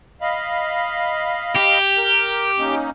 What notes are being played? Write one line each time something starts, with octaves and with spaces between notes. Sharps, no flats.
D#5 F5 B5
G4
A#4 G6
A#3 C#4 D#4